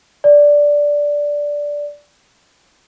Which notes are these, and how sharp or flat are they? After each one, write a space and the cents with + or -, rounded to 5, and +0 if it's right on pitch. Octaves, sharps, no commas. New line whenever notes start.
D5 -5